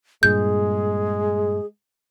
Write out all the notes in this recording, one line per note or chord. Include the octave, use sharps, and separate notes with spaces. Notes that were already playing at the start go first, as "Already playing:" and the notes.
G2 A#2 G#3 G#4 G6